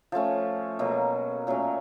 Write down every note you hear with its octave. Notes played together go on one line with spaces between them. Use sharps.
F3 A3 C#4
B2 F#3 A#3
A#2 F#3 A3 C#4